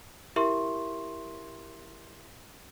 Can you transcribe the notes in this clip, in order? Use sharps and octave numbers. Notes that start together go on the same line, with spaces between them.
E4 G4 A#4 E5 C6 C#6